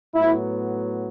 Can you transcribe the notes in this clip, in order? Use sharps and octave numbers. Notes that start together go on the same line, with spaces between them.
A2 F#3 B3 E4